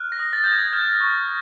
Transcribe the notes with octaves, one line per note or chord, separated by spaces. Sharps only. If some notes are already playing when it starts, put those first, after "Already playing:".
Already playing: F6 F#6
A#6
D#6
A6
D#6 G6
G#6
F6 G6
C#6